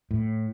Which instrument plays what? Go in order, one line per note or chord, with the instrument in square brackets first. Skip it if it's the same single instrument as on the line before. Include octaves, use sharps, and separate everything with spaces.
[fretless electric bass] A2